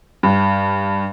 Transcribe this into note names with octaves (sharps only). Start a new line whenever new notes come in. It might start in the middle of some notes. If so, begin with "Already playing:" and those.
G2